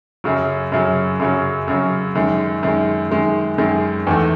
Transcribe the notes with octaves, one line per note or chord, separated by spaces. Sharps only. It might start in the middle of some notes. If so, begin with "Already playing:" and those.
F#2 C#3 F#3
F#2 C#3 F#3
F#2 C#3 F#3
F#2 C#3 F#3
F#2 D#3 G#3
F#2 D#3 G#3
F#2 D#3 G#3
F#2 D#3 G#3
E2 D#3 A3